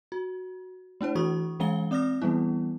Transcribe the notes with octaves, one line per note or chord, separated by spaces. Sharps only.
F#4
A3 D4 E4 C5
E3 F#4 C#6 D#6
E3 G#3 C#4 F5 G#5 G7
C4 D5 D#6 F6 A#6
E3 G3 B3 E4